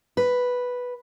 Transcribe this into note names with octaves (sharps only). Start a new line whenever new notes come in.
B4